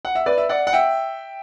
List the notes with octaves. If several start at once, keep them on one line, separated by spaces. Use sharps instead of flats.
F#5
E5
B4 D5
E5
D5 F#5
F#5
E5 G5